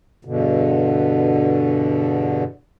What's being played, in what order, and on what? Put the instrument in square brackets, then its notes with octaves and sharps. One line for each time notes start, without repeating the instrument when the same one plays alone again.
[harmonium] E2 G2 B2 D3